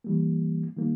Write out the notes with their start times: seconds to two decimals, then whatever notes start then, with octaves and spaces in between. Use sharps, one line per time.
0.04 E3 G3 A#3
0.77 D#3 G3 A#3